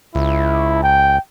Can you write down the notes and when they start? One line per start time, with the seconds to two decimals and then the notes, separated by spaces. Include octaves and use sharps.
0.15 C#2 E4
0.83 G5